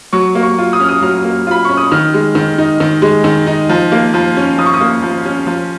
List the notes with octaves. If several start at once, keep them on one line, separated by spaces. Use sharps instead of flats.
F#3 C#6
A#3
C#6
F4
D#6
C#4 F6
D#6
F#3 F6
A#3
F4 B5
C#4 C#6
D#6
D#3 F6
G#3
D#3
D#4
D#3
G#3
D#3
D#4
F3
A#3
F3
C#4
F3 D#6
C#6
D#6
A#3
F3
C#4
F3